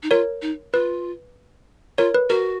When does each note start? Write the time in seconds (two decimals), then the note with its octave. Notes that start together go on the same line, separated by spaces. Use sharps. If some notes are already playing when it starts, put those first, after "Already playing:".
0.03 D#4
0.11 F4 A#4 C#5
0.42 D#4
0.73 F4 B4
1.98 F4 A#4 C#5
2.15 B4
2.30 F#4 A#4